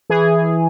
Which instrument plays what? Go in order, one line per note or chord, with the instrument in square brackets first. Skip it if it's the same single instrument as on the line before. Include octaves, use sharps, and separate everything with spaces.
[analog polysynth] E3 G#4